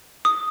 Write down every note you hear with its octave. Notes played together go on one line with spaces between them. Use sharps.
D#6